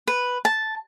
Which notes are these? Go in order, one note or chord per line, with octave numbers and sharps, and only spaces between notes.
B4
A5